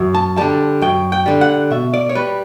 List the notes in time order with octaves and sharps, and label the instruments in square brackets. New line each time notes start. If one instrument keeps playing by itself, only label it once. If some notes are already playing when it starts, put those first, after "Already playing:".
Already playing: [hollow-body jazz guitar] F#2
A5
D3 G3 A5
F#2 G5
G5
D3 G3
F#5
B2 E5
D5
C#5
G3 B4